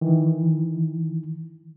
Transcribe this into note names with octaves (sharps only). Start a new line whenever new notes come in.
D#3 E3